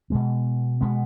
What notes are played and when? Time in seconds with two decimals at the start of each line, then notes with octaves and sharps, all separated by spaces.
0.10 B2 G#3 B3
0.81 B2 G#3 B3